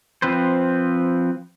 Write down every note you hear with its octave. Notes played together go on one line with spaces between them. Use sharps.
F3 C4 B4 C5